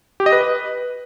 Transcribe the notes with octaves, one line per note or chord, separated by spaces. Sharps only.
G4
D#5
B4